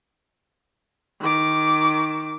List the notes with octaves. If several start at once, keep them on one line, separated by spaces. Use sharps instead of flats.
D#3 D6